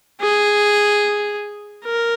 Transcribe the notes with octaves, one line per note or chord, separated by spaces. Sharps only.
G#4
A#4